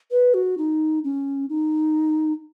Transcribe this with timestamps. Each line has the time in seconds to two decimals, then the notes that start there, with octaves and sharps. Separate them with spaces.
0.11 B4
0.34 F#4
0.58 D#4
1.04 C#4
1.50 D#4